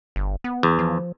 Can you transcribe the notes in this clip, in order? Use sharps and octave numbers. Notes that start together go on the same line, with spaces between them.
G1
B3
E2
F3